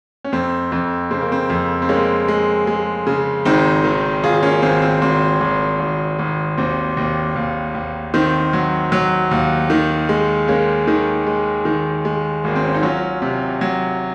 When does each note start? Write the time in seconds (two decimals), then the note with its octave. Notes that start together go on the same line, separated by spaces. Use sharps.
0.24 C#4
0.32 F2 C4
0.72 F2 C4
1.11 C#3 C4
1.21 A#3
1.32 C4
1.50 F2
1.82 C4
1.89 G#3 A#3 C#4
2.28 G#3
2.67 G#3
3.07 C#3
3.45 G#1 C4 D#4
3.84 D#3
4.24 G#1 F4 G#4
4.43 A#3 C#4
4.62 G#1 C4
4.82 C4
5.02 G#1 C4
5.41 G#1
5.80 G#1
6.19 G#1
6.58 D#2 C4
6.97 D#2
7.36 D#2
7.75 D#2
8.14 D#3 C4
8.53 F#3
8.92 F#3
9.31 D#2
9.70 D#3
10.09 G#3
10.48 G#3 A#3 C#4
10.88 D#3
11.27 G#3
11.65 D#3
12.05 G#3
12.44 G#1 A#3
12.55 C4
12.64 C#4
12.74 D#4
12.82 F#3 C#4 F4
13.22 C3
13.61 F#3